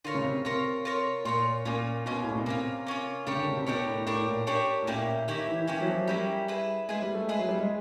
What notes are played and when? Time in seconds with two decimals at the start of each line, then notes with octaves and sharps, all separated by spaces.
0.05 D3 F4 A#4 C#5
0.15 C#3
0.24 C3
0.45 C3 F4 A#4 C#5
0.85 F4 A#4 C#5
1.25 A#2 F4 A#4 C#5
1.65 A#2 A#3 C#4 F4
2.06 B2 A#3 C#4 F4
2.24 A2
2.31 A#2
2.38 B2
2.46 C3 A#3 C#4 F4
2.87 A#3 C#4 F4
3.27 C#3 D4 G4 A#4 C#5
3.36 D3
3.47 C#3
3.57 C3
3.66 B2 D4 G4 A#4 C#5
3.86 A2
4.06 A2 D4 G4 A#4 C#5
4.27 A#2
4.47 D4 G4 A#4 C#5
4.82 A2
4.87 A#2 A#3 C#4 E4 G4
5.27 D#3 A#3 C#4 E4 G4
5.47 E3
5.67 E3 A#3 C#4 E4 G4
5.81 F#3
5.88 F3
6.01 F#3
6.08 G3 A#3 C#4 E4 G4
6.48 E4 G#4 B4
6.89 G#3 E4 G#4 B4
7.02 G3
7.14 A3
7.28 G#3 E4 G#4 B4
7.39 F#3
7.49 G3
7.59 G#3